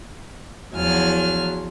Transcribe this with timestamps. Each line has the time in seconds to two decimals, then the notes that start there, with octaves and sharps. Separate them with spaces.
0.74 E2 F3 F#3 G#5 F6